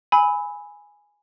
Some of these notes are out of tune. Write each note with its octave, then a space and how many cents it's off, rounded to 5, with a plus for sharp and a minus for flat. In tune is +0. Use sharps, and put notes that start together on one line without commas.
G#5 -5 B5 +5 E6 -30